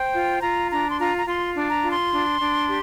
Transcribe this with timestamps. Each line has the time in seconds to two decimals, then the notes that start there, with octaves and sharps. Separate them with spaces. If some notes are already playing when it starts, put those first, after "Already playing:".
Already playing: C5 G5
0.14 F4
0.42 F4 A#5
0.70 D4 A#5
0.91 C6
0.98 F4 A#5
1.19 A#5
1.27 F4 C6
1.55 D4
1.69 A#5
1.83 F4
1.90 C6
2.11 D4
2.40 D4
2.67 G4